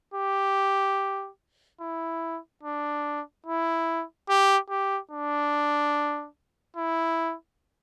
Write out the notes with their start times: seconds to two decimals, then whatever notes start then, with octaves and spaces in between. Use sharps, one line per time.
0.14 G4
1.81 E4
2.63 D4
3.46 E4
4.29 G4
4.70 G4
5.11 D4
6.76 E4